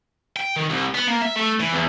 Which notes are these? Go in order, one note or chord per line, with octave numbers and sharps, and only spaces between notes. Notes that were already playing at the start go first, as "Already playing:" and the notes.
G5
D#3
C2
B3
A#3
E5
A3
E3
E2